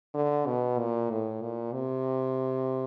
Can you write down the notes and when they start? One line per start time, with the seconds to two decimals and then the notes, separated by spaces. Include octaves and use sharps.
0.14 D3
0.47 B2
0.79 A#2
1.10 A2
1.42 A#2
1.73 C3